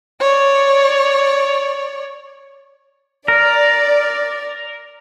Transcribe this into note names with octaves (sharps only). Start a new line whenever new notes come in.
C#5 D5
A#4 D5